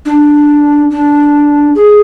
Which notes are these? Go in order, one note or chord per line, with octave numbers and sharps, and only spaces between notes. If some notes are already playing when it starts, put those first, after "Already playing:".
D4
D4
G#4